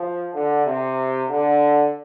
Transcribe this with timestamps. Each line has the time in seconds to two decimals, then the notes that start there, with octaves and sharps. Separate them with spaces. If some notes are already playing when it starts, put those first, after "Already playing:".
Already playing: F3
0.34 D3
0.66 C3
1.30 D3